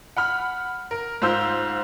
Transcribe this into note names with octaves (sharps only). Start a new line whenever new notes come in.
F#5 B5 F6
A#4
G#2 F4 C5 E6 G6